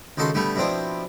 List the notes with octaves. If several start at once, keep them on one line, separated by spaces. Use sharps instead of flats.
C#2 D#3 F#4 A4 B5 C6
D3 G3 A3 B3
B2 F3 C4 D4 E4